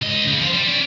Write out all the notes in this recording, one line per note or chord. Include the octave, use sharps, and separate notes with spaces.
C#2 D#5
C#3
F3 C5
G3
C#4 D5